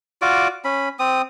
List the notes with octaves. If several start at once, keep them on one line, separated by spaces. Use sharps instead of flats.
F4 F#4 D5 D6
C#4 B5
C4 D#6